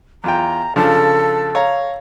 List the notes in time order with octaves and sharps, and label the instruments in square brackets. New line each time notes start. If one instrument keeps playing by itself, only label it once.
[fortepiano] E2 F4 G5 [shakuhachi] A#5
[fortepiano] C#3 F3 D4 [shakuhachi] A4
[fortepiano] C#5 F5 A#5